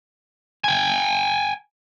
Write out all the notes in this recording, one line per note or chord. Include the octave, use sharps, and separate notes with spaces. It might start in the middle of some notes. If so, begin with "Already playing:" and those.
G5 G#5